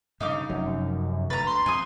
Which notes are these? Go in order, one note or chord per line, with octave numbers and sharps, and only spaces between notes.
G2 C#3 D#4 F5 D6
F1 F#2
D2 B4 A#5 A6
C6
F2 G#5 D#6